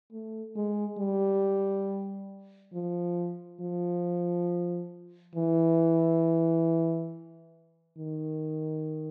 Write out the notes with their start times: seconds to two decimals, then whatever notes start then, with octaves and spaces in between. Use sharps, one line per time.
0.12 A3
0.55 G#3
0.98 G3
2.74 F3
3.61 F3
5.36 E3
7.98 D#3